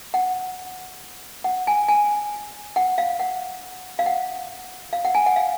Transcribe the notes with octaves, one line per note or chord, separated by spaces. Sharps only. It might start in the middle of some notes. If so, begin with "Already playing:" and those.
F#5
F#5
G#5
G#5
F#5
F5
F#5
F5
F#5
F5
F#5
G#5
F#5
F5